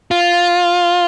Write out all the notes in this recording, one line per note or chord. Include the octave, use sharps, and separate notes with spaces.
F4